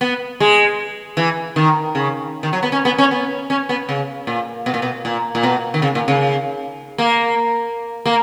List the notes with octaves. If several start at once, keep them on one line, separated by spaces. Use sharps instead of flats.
B3
G#3
E3
D#3
C#3
D#3
F#3
B3
C#4
B3
C#4
B3
C#4
B3
C#3
A#2
B2
A#2
B2
A#2
A#2
B2
D#3
C#3
A#2
C#3
A#3
A#3